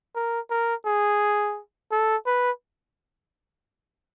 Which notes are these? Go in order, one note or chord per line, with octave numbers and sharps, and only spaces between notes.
A#4
A#4
G#4
A4
B4